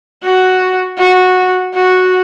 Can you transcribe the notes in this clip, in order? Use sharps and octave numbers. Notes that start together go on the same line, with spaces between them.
F#4
F#4
F#4